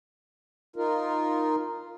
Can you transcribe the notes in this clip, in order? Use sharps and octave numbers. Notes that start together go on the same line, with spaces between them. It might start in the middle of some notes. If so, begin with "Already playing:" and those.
D#4 F4 A#4